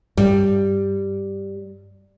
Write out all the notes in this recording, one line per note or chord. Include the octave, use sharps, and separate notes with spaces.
G2 G3